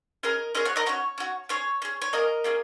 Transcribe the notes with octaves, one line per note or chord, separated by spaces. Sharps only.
C#4 G#4 A#4 D#5
C#4 G#4 A#4 D#5
C#5 F#5
A#4 D#5
C#4 F#4 C#5
C#4 F#4
C#4 G#4 C#5
C#4 G#4
C#5
A#3 C#4 G#4 A#4 D#5
A#3 C#4 G#4